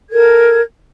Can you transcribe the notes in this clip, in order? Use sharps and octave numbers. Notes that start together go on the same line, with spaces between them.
A4 A#4 G#6